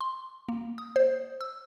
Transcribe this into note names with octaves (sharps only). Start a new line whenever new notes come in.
C6
A#3
D#6
C5
E6